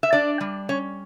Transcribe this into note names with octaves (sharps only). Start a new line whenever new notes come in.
E5
D4 D5
G3
C#4 C#5